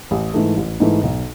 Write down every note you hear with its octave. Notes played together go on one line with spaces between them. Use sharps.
A1
G#2 E3 A3
A1
G#2 E3 A3
B1